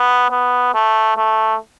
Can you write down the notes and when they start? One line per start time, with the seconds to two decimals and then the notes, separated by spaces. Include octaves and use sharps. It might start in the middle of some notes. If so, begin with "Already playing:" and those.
Already playing: B3
0.31 B3
0.74 A3
1.17 A3